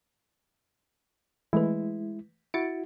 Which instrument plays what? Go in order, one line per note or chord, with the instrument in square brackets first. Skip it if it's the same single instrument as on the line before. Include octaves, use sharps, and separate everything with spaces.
[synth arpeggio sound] E3 A3 B4 [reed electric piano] G#3 E4
[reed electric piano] E4 F#4 [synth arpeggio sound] A6 C#7 D7